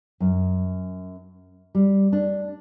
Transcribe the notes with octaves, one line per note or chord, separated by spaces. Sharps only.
F#2
G3
D4